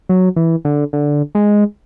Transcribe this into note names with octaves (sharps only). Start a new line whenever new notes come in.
F#3
E3
D3
D3
G#3